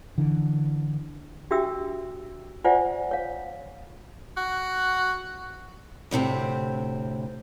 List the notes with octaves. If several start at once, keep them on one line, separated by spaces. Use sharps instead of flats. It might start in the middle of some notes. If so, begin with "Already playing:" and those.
D3 E3
D4 F#4 G4 E5 G5 E6
F4 C5 D5 E5 F#5 G#5
C#5 F5
F#4
D2 A2 C3 C4